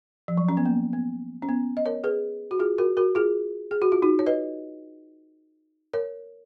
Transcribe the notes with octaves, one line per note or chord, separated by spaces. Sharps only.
F3
F#3
C#4
B3
A#3
B3
C#4
B3
D#5
A#4 C#5
G#4 B4
F#4
F4 G#4
F#4 A#4
F#4 A#4
F4 G#4
G#4
F#4
F4
D#4 F#4
C#5
B4 D#5
A#4 C#5